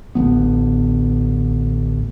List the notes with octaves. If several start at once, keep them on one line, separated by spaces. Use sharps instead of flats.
A1 D2 F3 B3